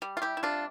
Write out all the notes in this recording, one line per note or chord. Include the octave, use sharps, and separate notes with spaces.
G3
F4
E4 G4
E4
C3 D4 F4